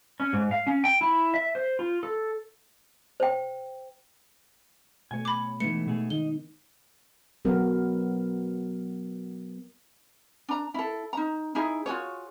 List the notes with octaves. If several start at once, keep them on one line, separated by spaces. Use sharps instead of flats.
C#4
G#2
F5
C#4
G5
E4
E5
C5
F4
A4
C5 G5
B2 A3 C#5 G#5
B5 D6
E3 G#3 A3 B3 D#4 C#7
B2 A3 G#4
D#3 D#4 G7
F#3 B3 A#4
D4 A#5
E4 A4
D#4 A#5
D#4 E4 G#4
F4 F#4 G#4 C#5